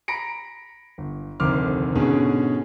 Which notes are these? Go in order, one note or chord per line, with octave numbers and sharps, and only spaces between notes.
A#5 B5 A#6 C#7 D7
G1
F1 D2 D#3 C4 D6 F6
G#2 B2 D3 C#4 G#4